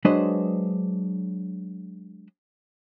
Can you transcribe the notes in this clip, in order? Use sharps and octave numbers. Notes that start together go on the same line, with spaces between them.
F#3 G#3 D4 B4 C5 D#5